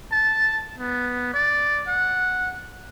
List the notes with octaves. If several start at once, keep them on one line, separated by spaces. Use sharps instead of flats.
A5
B3
D5
F#5